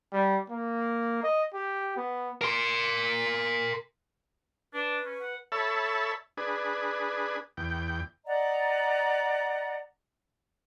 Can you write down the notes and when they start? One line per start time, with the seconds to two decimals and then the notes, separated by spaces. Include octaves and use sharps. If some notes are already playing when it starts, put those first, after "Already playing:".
0.12 G3
0.50 A#3
1.23 D#5
1.54 G4
1.96 B3
2.41 A#4 C6
4.74 D4 B4
5.06 C#4
5.22 F#5
5.52 A4 C#5 E5 A5 B5
6.37 D4 G#4 B4
7.57 E2 G5
8.26 D5 D#5 F#5 A#5